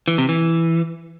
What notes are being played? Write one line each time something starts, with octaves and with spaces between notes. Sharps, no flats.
E3
C3
E3